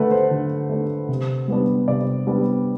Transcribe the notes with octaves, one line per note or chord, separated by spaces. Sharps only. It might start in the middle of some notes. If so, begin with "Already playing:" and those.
Already playing: D3 A3 D4 B4 F#5
C5
D3
A3 D4
C3
G3 B3 D4
C3 D5
G3 B3 D4